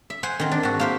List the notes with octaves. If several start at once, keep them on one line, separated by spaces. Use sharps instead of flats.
E5
C5 F#5 G#5
D#3 C4
D4
G#2 F#4
A#3 C5 E5